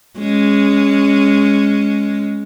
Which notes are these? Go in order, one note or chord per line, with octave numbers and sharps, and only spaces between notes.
G#3 C#4